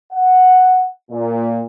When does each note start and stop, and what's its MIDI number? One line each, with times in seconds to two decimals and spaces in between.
0.12 0.86 78
1.10 1.64 46